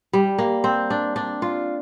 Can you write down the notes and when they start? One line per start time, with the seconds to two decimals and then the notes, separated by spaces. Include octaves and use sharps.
0.13 G3
0.38 A#3
0.64 C4
0.90 D4
1.16 D4
1.42 F4